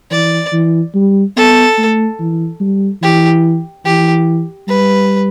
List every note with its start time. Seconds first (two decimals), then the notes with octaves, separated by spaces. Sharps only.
0.11 E3 D5
0.53 E3
0.95 G3
1.37 B3 A4
1.78 A3
2.20 E3
2.61 G3
3.02 E3 G4
3.85 E3 G4
4.68 G3 B4